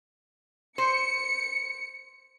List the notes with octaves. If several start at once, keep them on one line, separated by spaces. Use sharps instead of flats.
C5 C#7